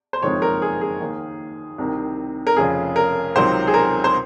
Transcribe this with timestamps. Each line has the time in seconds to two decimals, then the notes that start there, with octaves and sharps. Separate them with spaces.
0.13 C5
0.22 F#1 F2 D#3 G#3 C4 C#5
0.42 A#4
0.62 G#4
0.81 G#4
1.00 D#2 D#3 A#3
1.78 C2 C3 D#3
2.47 A#4
2.57 F1 F2 C#3 G#4
2.96 A#4
3.36 C#2 C3 D#3 F#3 C4 C5
3.67 G#4
3.74 A#4
4.04 C5